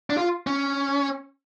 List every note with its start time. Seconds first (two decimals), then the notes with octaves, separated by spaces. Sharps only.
0.10 D4
0.17 F4
0.47 C#4